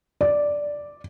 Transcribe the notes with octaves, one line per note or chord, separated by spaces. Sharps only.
D5